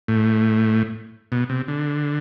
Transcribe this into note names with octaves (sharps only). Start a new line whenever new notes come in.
A2
B2
C3
D3